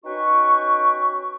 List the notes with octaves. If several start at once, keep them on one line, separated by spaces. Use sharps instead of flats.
C#4 D#4 F#4 B4 G5 C#6